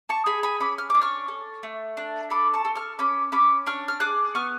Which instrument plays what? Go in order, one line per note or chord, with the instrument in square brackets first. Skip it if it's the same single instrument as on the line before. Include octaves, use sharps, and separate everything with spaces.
[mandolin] A5 C#6
G#4 G#5 B5
G#5 B5
C#4 B5 D6
F6
D4 D6
C#6 F6
A4
A3
D4
A4 B5 D6
A5 C#6
A4
C#6 F6
C#4 B5 D6
C#4 B5 D6
D4 C#6 F6
F6
G#4 D6 F#6
B3 C#6 F6